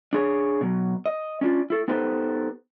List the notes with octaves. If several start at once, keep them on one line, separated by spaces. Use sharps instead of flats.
D4 G#4 C#5
B2 F#3
D#5
C#4 D4 F4
E4 A4
B3 D#4 G4 A4 B4 C5